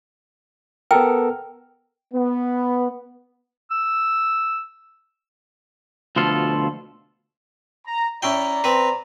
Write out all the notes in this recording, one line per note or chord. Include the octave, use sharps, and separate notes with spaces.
B3 A4 A#4 G5
B3
E6
D2 B2 F3 F4 A4 F5
A#5
C#4 E4 D5 G5 A#5
C4 B4